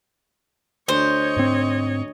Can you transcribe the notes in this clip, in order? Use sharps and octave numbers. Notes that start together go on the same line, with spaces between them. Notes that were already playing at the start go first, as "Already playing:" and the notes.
D2 C5 C#5 D#5
G#2 C4